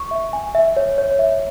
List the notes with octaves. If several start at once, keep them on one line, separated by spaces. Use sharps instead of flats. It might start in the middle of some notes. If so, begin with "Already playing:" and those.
Already playing: C#6
E5
G#5
E5
C#5
C#5
E5